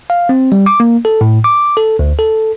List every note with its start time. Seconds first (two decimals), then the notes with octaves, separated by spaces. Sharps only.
0.10 F5
0.29 C4
0.52 G3
0.66 D6
0.80 A#3
1.05 A4
1.21 A2
1.44 D6
1.77 A4
1.99 D2
2.19 A4